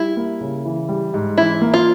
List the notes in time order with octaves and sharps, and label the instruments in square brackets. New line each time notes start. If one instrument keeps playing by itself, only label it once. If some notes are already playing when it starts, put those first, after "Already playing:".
Already playing: [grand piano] G3 [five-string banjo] E4
[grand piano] A#3
C#3
E3
G3
G#2
[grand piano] E3 [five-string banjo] E4
[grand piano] A#3
[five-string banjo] F4